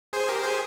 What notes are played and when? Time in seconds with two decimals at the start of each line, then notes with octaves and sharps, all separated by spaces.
0.13 G#4 C5
0.28 G4 A#4
0.43 G#4 C5